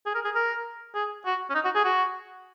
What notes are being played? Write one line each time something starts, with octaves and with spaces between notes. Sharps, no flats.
G#4
A#4
G#4
A#4
G#4
F#4
C#4
D#4
F#4
G#4
F#4